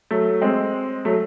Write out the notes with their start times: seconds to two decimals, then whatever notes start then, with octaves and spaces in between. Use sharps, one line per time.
0.11 F#3 A3
0.42 G#3 C4
1.05 F#3 A3